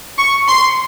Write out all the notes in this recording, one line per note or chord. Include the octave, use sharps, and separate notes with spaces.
C#6
C6